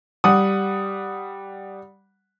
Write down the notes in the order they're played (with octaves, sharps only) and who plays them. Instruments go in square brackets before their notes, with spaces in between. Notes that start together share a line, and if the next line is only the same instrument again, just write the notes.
[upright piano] G3 F#5 D#6